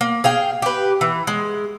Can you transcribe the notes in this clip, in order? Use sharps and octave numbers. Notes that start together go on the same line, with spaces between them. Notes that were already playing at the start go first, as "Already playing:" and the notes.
A#3
G#4 F5 G5
G4 B4
E3
G#3